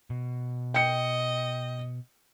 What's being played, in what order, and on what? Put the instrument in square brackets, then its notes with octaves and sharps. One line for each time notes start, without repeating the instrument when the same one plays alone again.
[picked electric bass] B2
[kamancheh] D#5 [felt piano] G5 C#7